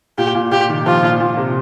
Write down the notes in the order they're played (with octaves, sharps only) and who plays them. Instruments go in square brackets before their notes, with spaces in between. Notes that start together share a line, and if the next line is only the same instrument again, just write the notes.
[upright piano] A#2 [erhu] G4
[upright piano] A#2
[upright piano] A#2 [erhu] G4
[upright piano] D#3
[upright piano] F3 [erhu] F4
[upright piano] A#2
A#2
C3